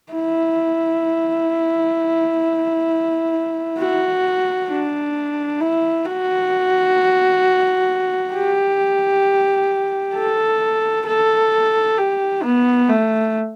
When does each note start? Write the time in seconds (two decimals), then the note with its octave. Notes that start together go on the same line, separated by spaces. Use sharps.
0.13 E4
3.78 F#4
4.69 D4
5.61 E4
6.06 F#4
8.33 G4
10.15 A4
11.07 A4
11.98 G4
12.43 B3
12.89 A3